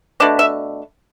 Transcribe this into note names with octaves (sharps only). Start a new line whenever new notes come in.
B2 A3 D4 D5
E5